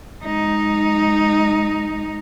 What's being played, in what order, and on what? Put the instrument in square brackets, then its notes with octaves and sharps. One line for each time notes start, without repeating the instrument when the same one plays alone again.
[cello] G#3 D#4